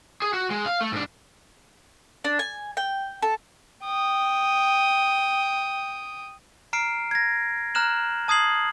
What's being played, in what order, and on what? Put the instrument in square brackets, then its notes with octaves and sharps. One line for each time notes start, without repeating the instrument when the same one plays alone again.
[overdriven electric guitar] G#4
F#4
G#3
F5
A3
G#2 D4
[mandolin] D4
G#5
G5
A4
[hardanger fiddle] G5 D#6
[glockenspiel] A#5 F6 C7 D7
G#6 A#6
A#5 F6 F#6 E7 F#7
A5 D#6 G#6 C7 F#7